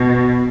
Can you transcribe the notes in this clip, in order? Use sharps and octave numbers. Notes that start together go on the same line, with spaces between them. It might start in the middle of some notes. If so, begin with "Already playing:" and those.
Already playing: B2